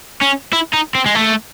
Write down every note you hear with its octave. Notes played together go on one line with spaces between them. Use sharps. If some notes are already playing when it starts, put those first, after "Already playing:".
C#4
E4
D#4
C4
G#3
A3